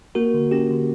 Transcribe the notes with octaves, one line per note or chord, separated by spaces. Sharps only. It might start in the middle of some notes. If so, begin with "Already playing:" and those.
A#3 F#4 A#4
D3
C#4 G4
D3